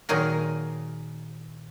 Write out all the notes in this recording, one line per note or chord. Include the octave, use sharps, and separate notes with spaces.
A#2 D#3 F#3 G#4 A#4